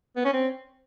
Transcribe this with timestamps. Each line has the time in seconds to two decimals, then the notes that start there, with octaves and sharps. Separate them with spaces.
0.17 B3
0.25 C#4
0.33 C4